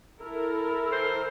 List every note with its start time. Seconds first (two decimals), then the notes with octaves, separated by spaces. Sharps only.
0.21 E4 A4 A#4
0.91 E3 C5